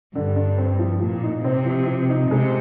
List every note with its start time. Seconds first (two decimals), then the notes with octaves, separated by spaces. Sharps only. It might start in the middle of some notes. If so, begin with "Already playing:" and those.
0.15 G2 D3
0.36 D4
0.58 C4
0.79 F3
1.00 A#2 F3
1.23 D#4
1.44 C3 C4
1.66 F3
1.87 F3
2.09 D#4
2.31 C3 G#3